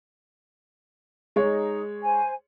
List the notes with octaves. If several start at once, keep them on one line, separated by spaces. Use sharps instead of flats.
G#3 D#4 C#5
C5 G#5